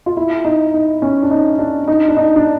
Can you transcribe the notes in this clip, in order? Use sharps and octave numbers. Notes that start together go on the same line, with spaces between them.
F4
E4
D#4
D#4
C#4
D4
D#4
D4
D#4
D4
D#4
D4